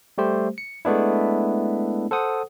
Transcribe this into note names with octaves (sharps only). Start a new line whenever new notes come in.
G3 A3 G4 C5
C#7
G#3 A3 B3 D4 E4
A4 C5 F#5 D#6